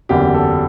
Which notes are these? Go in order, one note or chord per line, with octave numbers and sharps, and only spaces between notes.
F#1 E2 D3 F#3 G4
A4